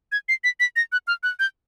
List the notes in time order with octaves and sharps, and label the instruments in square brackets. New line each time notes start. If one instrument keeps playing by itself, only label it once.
[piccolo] G#6
C7
B6
B6
A#6
F#6
F6
F#6
G6